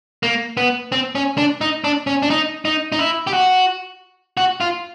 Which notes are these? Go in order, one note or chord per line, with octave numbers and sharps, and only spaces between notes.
A#3
B3
C4
C#4
D4
D#4
D4
C#4
D4
D#4
D#4
D#4
E4
G4
F#4
F#4
F4